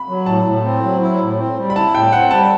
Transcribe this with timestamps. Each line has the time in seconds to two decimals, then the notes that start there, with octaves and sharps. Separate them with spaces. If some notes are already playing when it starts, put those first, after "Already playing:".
Already playing: B5
0.08 F#3
0.26 A2 A5
0.45 A2
0.64 C4
0.83 F#3
1.01 E4
1.20 A2
1.38 C4
1.57 G3
1.70 B5
1.75 E4 A5
1.94 A2 G5
2.12 C4 F#5
2.31 G3 A5